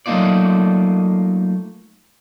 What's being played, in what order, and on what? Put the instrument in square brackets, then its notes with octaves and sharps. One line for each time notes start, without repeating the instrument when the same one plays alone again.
[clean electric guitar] F#3 A3 A#3 D#4 F4 D5